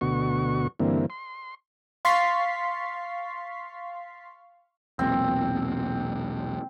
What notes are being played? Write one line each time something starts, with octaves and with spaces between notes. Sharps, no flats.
D2 B2 F#4 C#6
G2 D3 E3 A#3 C4
C6
F5 C6 C#6 A6 B6 C7
E1 B1 A#2 C4